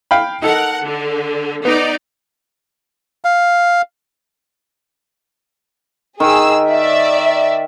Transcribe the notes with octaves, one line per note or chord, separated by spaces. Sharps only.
F5 G5 B5
D#4 A4 A#4 F#5
D3
B3 D#4 D5
F5
D#3 G#4 E6
D5 E5